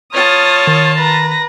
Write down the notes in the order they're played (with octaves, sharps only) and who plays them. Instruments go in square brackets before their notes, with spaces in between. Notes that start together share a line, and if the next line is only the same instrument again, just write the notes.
[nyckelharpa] F4 A5 [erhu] C#5 [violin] D#6 F6
[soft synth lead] D#3
[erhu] B4 [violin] A#5 A#6